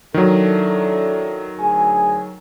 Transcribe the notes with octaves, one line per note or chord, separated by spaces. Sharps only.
D#3 F#3 D4 E4 A4
D2 G#4 G#5